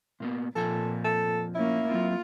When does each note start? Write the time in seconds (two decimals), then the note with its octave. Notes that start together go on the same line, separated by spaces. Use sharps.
0.20 A#2 A#3 B3
0.56 F2 A#2 F3 A4 G#5
1.04 A4
1.55 A#3 C#4 E4
1.91 F#3 C4 F4